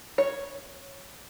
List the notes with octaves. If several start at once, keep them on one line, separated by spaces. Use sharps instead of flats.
C#5